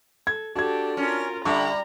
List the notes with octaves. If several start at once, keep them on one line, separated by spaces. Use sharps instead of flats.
A4 G#6
D4 F#4 G4 A4 G#6
C#4 F4 A#4
D3 G3 E5 A#5 C#6